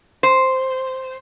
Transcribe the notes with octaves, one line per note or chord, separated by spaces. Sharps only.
C5